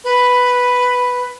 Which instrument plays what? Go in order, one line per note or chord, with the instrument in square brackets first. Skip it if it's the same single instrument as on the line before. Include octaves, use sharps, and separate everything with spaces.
[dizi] B4